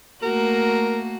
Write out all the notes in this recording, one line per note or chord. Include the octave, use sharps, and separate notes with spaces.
A3 A#3 F#4 A#4